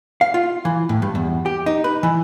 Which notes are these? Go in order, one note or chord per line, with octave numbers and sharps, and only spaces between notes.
F5
F4
E3
A2
G2
E2
G4
D#4
B4
E3